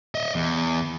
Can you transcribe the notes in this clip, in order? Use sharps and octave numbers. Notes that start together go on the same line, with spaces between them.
D#5 E5
E2